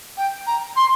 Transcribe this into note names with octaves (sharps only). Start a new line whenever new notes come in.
G5
A#5
C6